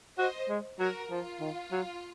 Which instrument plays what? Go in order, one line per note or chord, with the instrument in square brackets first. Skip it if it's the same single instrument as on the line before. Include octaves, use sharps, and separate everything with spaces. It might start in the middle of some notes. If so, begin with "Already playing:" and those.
[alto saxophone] F#4 [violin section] C5 D#5
[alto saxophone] G#3
[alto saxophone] F#3 [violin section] F#4 A#4
[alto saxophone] F3 [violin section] F4
[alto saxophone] D#3
F#3